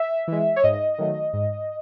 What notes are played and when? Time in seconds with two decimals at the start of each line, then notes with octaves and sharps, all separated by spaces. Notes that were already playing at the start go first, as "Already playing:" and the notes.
Already playing: E5
0.28 E3 G#3
0.56 C#5
0.63 G#2 D#5
0.98 D#3 F#3 A3
1.33 G#2